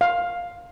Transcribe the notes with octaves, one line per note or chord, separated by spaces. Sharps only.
F5